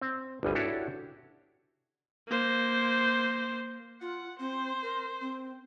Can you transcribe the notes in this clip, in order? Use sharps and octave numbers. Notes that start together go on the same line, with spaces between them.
C4
G1 D2 G3 G#5
D4 E4 F#4 G4 A4 C#5
A#3 C5
F4 F#5
C4 C5
A#4
C4